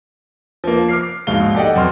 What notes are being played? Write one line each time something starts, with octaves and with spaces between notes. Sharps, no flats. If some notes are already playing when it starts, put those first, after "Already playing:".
F3 A#3
D6 F6 C7
A#1 G#2 B2 F5 G7
G4 A4 D5 D#5 F#5 G5
F#2 B2 C4 C6 F6